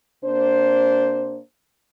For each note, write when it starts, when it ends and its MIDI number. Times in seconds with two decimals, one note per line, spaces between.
0.25 1.39 48
0.25 1.39 58
0.25 1.39 62
0.25 1.39 72